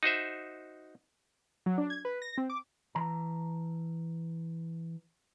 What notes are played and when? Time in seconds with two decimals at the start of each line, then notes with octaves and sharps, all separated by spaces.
0.03 D#4 F#4 C5 E5
1.66 F#3
1.78 D4
1.90 G#6
2.05 B4
2.22 A#6
2.38 C4
2.50 D6
2.95 E3 A5 A#5